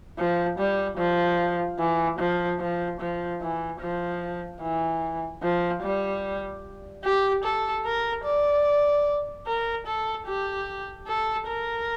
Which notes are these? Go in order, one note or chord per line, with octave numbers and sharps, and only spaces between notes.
F3
G3
F3
E3
F3
F3
F3
E3
F3
E3
F3
G3
G4
A4
A#4
D5
A#4
A4
G4
A4
A#4